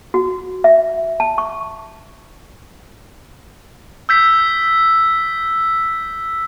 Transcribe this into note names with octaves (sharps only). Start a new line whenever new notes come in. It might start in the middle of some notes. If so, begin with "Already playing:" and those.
F#4
E5
A5
C#6
E6 G6 B6